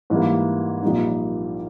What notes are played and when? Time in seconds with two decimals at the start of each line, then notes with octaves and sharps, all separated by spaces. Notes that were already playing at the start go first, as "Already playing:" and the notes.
0.10 G#2 E3 G3 A#3
0.82 A#1 A#2 G3 A#3 D#4